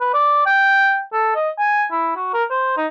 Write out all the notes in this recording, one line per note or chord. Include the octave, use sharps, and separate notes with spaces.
B4
D5
G5
A4
D#5
G#5
E4
F#4
A#4
C5
D#4